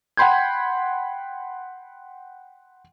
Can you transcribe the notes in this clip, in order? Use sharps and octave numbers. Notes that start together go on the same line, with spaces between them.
F#5 G5 B5 C6 G6 G#6